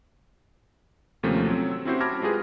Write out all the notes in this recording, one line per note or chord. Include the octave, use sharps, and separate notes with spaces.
D#2 C3 F3 A3 A#3 C#4
F#3 C4
E6
C4 C#4 E4 F#4 G4 C5
A5 B5 D6 F6 G#6 A#6
G#3 F4 G4 G#4 B4